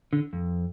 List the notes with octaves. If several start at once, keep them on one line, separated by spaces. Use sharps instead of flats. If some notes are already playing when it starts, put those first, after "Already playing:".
D3
F2